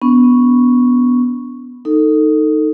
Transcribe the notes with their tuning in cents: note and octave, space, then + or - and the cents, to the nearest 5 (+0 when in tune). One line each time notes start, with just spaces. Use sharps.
B3 +0 D4 -30 C#6 +0
D#4 +0 A4 +20